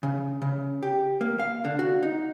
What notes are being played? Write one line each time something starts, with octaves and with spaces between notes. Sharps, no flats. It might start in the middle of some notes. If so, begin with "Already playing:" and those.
C#3
C#3
G4
A#3
F5
D3
F#4
D#4